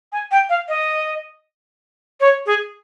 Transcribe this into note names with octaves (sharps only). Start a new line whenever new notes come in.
G#5
G5
F5
D#5
C#5
G#4